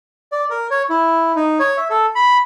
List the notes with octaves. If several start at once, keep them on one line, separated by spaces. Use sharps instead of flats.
D5
A#4
C#5
E4
D#4
C#5
E5
A4
B5